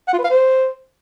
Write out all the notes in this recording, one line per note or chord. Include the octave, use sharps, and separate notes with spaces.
F#5
F4
B4
F5
C5